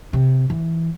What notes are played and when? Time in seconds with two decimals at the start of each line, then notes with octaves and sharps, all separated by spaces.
0.13 C3
0.50 E3